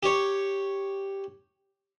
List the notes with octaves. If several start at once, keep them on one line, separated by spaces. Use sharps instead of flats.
G4 C#5